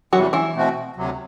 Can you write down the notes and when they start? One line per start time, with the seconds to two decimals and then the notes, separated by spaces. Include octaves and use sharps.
0.13 E2 C3 E3 F#3 G3 F#4
0.33 E3 E4
0.54 B2 A3 C4 F#4
0.96 D2 C3 F#3